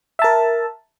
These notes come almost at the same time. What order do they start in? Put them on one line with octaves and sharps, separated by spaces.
E5 A5 A#4